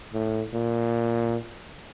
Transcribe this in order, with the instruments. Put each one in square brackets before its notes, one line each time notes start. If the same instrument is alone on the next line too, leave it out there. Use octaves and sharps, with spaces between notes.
[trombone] A2
A#2